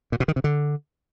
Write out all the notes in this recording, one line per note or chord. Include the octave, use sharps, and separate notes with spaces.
A#2
B2
D#3
C3
D3